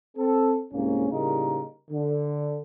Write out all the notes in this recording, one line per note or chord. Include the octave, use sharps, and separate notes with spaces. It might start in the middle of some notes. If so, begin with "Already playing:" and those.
C4 A4
C2 G#2 A#3 C#4
A2 C#3 G3 A#3 D#4 A#4
D3